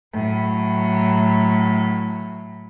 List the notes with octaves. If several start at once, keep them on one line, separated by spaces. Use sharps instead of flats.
A2 F#3